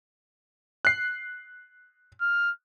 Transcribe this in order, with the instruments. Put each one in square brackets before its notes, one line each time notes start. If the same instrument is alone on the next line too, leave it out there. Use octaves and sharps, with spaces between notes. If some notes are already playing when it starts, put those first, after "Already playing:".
[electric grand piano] F#6 C7
[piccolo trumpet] F6